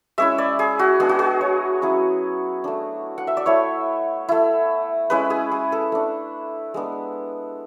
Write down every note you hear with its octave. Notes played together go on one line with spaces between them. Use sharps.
G#3 C#4 E4 E5
D5
G#4
F#4
G#3 B3 D4 G#4
F#4
G#4
C#5
F#3 C#4 E4
A3 D4
F#5
E5
D5
A3 E4 C#5
A3 E4
G#3 C#4 E4 B4
G#4
G#4
A4
A3 D4
G#3 B3 D4